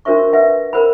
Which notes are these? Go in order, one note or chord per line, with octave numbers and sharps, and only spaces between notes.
D4 F#4 A#4 C5 E5 C#6
B4 E5 F#5
A#4 C5 F#5 B5